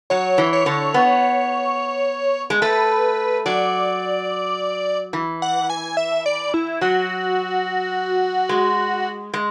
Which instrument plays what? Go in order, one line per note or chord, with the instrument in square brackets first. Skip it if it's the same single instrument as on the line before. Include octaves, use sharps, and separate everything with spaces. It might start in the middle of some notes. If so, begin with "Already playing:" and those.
[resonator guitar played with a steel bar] F#3 [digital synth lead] C#5
[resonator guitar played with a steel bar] E3
[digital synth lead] C#5
[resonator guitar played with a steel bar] D3
B3
G#3
[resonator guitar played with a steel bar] A3 [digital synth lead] B4
[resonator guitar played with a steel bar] F#3 [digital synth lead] D5
[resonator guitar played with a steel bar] E3
[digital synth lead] F#5
G#5
E5
D5
E4
[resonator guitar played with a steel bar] F#3 [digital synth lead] F#4
[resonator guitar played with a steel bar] G#3
G#3